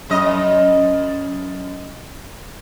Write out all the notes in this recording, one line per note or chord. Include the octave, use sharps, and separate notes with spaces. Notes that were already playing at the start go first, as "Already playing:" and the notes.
F#2 D#5